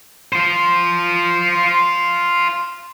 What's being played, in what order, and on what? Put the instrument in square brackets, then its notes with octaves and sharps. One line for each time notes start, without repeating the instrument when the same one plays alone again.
[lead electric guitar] F4 C5